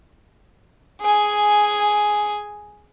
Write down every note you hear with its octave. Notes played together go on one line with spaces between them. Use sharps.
G#4 G#5